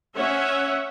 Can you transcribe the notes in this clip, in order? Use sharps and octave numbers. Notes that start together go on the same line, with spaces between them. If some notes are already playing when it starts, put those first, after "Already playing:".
C#4 C#5 E5 F#5